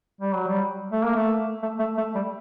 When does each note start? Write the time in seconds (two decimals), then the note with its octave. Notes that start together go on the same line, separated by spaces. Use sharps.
0.21 G3
0.34 F#3
0.47 G3
0.92 A3
1.04 A#3
1.16 A3
1.62 A3
1.79 A3
1.97 A3
2.15 G3